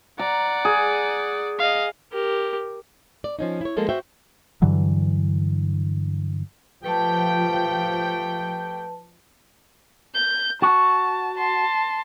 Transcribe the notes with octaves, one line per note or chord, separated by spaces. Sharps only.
D5 F#5 A#5
G#4
D#5 F5
G4 A#4
D5
F3 C#4 D#4
E4 C#5
F3 G#3 A#3 A4
F#4 C5 E5 G5
G2 D3 E3 F#3
F3 A3 G4 B4 G5 A5
G6
F#4 A5
A5 C6